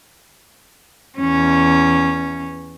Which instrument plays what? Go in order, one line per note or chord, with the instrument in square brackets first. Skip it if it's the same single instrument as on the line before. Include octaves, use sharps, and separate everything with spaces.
[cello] E2 C#4